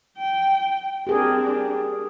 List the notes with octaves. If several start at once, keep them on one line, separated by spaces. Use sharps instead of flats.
G5
C4 D4 G4 G#4 A#4